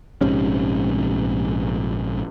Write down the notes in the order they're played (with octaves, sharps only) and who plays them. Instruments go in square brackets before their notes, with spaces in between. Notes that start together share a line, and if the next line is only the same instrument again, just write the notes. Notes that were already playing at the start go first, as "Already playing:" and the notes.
[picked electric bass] A#1 G#2 C3 C#4